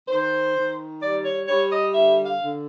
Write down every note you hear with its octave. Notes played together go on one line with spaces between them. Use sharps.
D#3 C5
D#3
G3 D5
C#5
G3 C#5
D#5
D3 E5
F5
D3